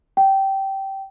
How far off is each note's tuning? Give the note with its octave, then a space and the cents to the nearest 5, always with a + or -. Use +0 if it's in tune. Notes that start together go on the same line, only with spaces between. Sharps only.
G5 -15